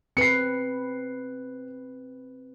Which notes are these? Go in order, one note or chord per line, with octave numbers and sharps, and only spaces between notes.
C4 B4 C7 C#7